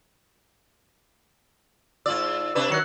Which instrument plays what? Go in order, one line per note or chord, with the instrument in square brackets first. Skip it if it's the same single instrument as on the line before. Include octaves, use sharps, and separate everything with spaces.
[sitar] G#2 F4 D5 [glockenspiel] E6
[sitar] C3 D4 B4
[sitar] D#3 F#3 [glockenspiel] F#6 C#7 F#7